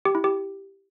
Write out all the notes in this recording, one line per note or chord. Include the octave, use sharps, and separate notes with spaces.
G4
E4
G4